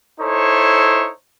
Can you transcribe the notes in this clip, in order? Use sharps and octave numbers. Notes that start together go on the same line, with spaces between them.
D#4 E4 A4 C5 C#5